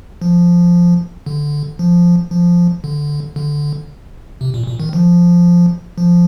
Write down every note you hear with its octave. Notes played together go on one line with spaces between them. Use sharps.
F3
D3
F3
F3
D3
D3
C3
A#2
A#2
D#3
F3
F3